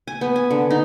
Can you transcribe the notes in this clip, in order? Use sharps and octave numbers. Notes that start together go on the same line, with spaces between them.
G#5
B3
G#5
D3
D#4